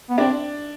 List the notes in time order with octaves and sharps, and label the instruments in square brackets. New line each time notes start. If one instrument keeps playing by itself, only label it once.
[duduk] B3
[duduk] C4 [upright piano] D4 D5